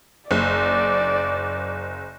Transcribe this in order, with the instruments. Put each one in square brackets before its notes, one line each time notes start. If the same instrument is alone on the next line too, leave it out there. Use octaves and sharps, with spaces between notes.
[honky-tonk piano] F#1 [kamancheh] D5